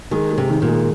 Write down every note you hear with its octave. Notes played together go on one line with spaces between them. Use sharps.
D#3 G#3
G#3
C3
D#3
A#2
G#3